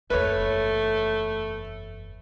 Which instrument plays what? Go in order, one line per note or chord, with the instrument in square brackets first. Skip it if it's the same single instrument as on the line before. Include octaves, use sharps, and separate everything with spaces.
[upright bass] F#1 E2 [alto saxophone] A3 [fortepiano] B4 C#5